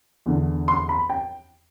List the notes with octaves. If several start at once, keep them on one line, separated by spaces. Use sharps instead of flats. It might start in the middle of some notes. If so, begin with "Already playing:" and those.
E2 D3
C6
B5
G5